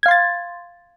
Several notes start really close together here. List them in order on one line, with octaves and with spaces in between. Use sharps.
G#6 F5 C6 A6